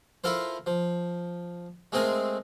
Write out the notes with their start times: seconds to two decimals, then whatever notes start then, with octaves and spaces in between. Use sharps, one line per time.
0.24 E4 F4 A4 A#4 C5
0.66 F3
1.92 G#3 A3 C4 G#4 A#4